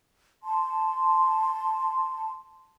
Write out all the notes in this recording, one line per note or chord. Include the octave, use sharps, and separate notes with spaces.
A5 C6